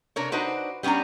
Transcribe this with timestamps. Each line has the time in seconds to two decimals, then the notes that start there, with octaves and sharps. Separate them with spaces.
0.16 C3 D4 A#4 C#5
0.32 D4 D#4 F#4 B4 C5
0.83 G3 B3 C#4 D4 A#5